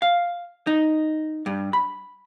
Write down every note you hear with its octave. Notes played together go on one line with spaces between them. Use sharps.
F5
D#4
G2
B5